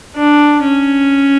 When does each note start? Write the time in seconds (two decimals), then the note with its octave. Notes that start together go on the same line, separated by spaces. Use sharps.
0.16 D4
0.64 C#4